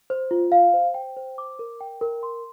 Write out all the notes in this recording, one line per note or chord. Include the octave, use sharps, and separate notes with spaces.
C5
F4
F5
C5
G5
C5
D6
A#4
G5
A#4
C6